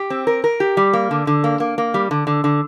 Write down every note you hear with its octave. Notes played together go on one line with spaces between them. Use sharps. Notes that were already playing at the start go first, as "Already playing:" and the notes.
Already playing: G4
C4
A#4
A#4
G4
G3
A#3
D3
D3
A#3
A#3
A#3
G3
D3
D3
D3